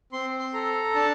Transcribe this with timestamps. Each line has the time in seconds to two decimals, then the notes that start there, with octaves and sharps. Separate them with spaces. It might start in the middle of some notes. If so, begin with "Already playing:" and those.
0.12 C4 C6
0.39 C6
0.53 A4 A#5
0.95 D4 A5